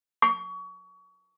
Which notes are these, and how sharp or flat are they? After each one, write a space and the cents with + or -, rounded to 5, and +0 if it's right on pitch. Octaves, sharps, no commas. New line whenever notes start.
C#6 +30